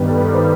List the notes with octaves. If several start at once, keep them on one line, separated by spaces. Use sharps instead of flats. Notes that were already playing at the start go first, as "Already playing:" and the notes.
Already playing: G2 D#3 G3 B3
A4
B4
C5